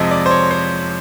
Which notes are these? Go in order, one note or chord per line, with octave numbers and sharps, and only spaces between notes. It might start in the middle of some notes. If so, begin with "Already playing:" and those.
Already playing: F2 C3 F3 G#3 D#5
D5
C5
C#5
C5